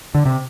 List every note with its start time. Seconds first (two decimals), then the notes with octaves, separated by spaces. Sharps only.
0.15 D3
0.26 C3